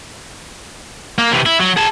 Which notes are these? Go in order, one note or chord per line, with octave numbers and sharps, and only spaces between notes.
A#3
C3 E3
E4
F#3
G#4 A5